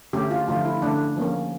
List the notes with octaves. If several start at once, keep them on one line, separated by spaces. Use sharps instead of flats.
D3 A3 C#4 G4
F4
D3 F3 A3 F4
E4
D3 A3 C#4 D4
F3 A#3 C#4